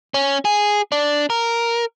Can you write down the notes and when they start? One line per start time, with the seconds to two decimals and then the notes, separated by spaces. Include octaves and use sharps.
0.14 C#4
0.45 G#4
0.92 D4
1.30 A#4